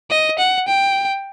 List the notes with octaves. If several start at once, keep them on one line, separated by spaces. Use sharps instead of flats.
D#5
F#5
G5